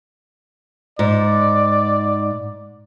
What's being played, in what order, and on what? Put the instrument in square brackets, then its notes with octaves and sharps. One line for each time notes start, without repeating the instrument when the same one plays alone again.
[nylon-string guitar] G#2 [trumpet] D5